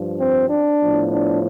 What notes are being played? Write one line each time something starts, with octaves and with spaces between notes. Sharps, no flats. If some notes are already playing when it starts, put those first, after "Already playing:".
Already playing: G2 F3
C4
D4
A2 F3 B3
D4